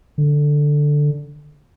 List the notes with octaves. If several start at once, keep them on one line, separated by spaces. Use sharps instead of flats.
D3